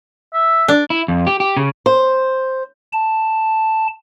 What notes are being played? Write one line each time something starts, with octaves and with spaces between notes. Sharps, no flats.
E5
D4
E4
F2
G4
G4
C#3
C5
A5